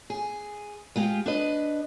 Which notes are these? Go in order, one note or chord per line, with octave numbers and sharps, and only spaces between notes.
G#4
G#3 F4 G4
D4 B4 D#5